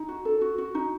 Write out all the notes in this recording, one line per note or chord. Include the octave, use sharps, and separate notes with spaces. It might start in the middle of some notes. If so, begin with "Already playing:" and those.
Already playing: D#4
F#4
A4
F#4
F#4
D#4